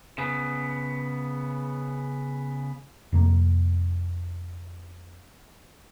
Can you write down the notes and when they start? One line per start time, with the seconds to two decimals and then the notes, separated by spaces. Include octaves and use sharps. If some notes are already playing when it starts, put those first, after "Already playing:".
0.18 C#3 B3
3.12 F2 C3 A#3